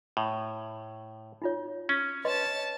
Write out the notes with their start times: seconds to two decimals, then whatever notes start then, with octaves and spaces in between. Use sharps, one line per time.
0.17 A2
1.42 D#4 F4 C#5
1.89 C#4
2.25 B4 C#5 D#5 A5 C6